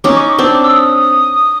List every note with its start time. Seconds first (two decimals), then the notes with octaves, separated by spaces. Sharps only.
0.04 C#4 D#4 D6
0.17 C#6
0.29 D6
0.39 C4 D4
0.64 E6
0.73 D#6